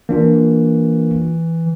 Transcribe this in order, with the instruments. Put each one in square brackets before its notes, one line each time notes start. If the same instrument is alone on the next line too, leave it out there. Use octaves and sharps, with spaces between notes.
[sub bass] E3 [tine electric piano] A#3 D4 F4